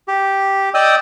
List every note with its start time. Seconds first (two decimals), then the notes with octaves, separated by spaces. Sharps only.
0.08 G4
0.74 D5 D#5 G5 D#6 E6